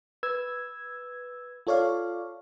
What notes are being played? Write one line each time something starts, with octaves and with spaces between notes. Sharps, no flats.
B4 E6 G#6
F4 A4 C#5 D5 F5